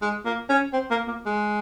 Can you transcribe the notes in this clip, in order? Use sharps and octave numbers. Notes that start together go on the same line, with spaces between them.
G#3
A#3
C#4
C4
A#3
A#3
G#3